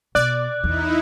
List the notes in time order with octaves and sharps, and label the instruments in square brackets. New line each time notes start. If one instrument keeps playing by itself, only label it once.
[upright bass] B2 [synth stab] D5 [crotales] F#6
[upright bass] E2 [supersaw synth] D#4 E4